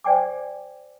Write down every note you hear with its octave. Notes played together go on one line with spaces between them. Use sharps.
C5 D5 G5 G#5 D6